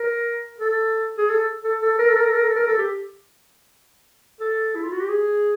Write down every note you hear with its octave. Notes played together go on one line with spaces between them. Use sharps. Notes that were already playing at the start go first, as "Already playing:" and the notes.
Already playing: A#4
A4
G#4
A4
A4
A4
A#4
A4
A#4
A4
A#4
A4
A#4
A4
G4
A4
E4
F4
F#4
G4
G#4